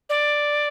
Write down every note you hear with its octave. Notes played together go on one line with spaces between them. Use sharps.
D5